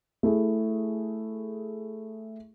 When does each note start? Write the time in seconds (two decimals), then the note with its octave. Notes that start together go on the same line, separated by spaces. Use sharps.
0.23 A3 E4 G#4